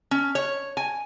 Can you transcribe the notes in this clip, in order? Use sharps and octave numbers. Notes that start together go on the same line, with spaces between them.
C#4
C#5
G#5